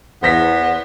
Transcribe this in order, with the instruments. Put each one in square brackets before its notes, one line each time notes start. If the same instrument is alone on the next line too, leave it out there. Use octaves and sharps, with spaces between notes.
[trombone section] E2 [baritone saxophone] B3 [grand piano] C5 A#6 B6